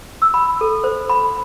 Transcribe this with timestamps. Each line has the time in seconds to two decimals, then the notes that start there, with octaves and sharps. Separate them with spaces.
0.22 E6
0.34 B5
0.61 A4
0.84 C5
1.09 B5